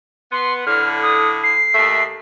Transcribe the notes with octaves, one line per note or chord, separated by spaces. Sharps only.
B3 C6
A2 D3 F6
D#6
C7
D#2 A3 E5